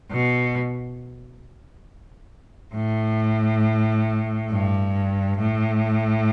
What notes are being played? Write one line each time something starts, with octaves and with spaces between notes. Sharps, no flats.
B2
A2
G2
A2